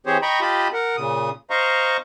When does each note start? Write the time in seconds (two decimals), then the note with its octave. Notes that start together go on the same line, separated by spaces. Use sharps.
0.06 E3 C4 G4 G#4 C5 C#5
0.22 D#5 G5 A#5 B5 C#6
0.41 F4 G4 D#5 A5 B5
0.73 A#4 F#5
0.97 A#2 C#3 D#6
1.50 C5 D#5 F5 A#5 C#6